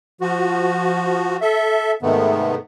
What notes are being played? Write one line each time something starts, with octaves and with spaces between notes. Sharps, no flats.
F3 F#4
A4 E5
G#2 C3 D#3 A3 B3